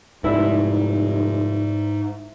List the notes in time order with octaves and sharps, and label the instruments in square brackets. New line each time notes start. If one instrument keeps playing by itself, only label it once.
[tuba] F1 [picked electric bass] G#2 [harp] E4 [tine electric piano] B4 D5